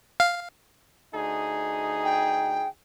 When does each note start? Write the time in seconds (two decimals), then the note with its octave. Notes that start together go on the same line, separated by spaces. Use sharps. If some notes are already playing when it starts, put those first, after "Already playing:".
0.20 F5
1.14 D2 D#4 G#4
2.04 G5